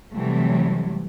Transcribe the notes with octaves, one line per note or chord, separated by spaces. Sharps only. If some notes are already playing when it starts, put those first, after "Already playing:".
C3 E3 F#3 G3 A3